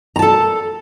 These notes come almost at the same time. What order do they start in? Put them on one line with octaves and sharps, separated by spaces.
A#5 A5 A4